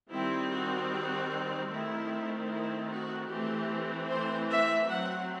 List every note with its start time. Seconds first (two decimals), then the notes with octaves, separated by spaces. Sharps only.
0.11 D#3 G3 C4 E4
0.51 F#4
0.91 F#4
1.70 D#3 A3 C4 E4
2.50 E4
2.90 F#4
3.29 E3 A3 C4 G4
4.09 C5
4.49 E5
4.88 F#3 C4 F#5